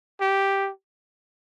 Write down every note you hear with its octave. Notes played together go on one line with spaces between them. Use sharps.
G4